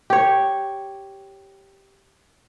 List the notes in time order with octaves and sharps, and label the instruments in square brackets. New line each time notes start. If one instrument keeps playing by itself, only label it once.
[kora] G4 C#5